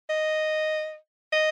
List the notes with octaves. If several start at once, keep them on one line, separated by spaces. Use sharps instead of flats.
D#5
D#5